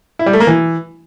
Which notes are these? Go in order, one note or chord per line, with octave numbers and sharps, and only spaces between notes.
E4
G3
A3
A#3
E3